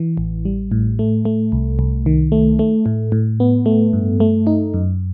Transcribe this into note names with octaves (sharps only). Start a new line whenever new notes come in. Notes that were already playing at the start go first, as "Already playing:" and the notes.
Already playing: E3
A1
G3
A2
A3
A3
C2
C2
D#3
A3
A3
A2
A2
B3
A3
G2
A3
D#4
F#2